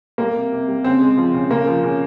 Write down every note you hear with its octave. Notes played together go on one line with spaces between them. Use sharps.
G3 A#3
C3
C3
G3
C#3 C4
G#3
F3
C#3
C#3 A#3
F3
C#3